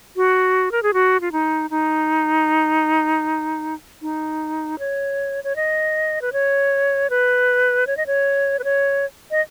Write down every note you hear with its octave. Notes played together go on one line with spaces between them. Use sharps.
F#4
A#4
G#4
F#4
F4
D#4
D#4
D#4
C#5
C#5
D#5
B4
C#5
B4
C#5
D#5
C#5
B4
C#5
D#5